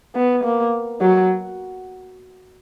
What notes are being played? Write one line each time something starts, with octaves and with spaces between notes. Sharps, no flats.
B3
A#3
F#3